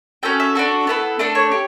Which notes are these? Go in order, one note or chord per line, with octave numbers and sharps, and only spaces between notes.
C#4 F#4 A4 G5
E5
D4 F#4 A4
B3 E4 A4
A3 D4 A4
C#5
G4